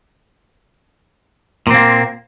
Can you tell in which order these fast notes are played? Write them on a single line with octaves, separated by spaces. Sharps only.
A#2 C4 A#3